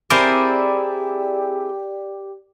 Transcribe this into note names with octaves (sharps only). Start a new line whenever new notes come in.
C4 E4 G4 G#4 A#4 C5 D5